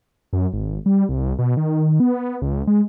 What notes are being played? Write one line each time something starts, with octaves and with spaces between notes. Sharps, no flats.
F#2
G#1
G3
C2
B2
D#3
B3
C#2
G#3